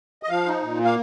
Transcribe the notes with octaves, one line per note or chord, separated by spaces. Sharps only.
D#5
F3 F5
D#4
A#2
A#3
F5